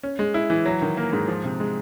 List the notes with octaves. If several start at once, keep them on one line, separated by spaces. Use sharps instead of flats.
C#4
G#3
E4
E3
F#3
D#3
A#3
G#2
F3
C3
G#3